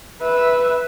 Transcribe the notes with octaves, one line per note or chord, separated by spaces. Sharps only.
B4 E5